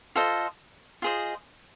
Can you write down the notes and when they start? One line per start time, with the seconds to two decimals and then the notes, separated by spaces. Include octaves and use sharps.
0.16 F4 A4 C5 D#5
1.02 F4 G#4 C5 D#5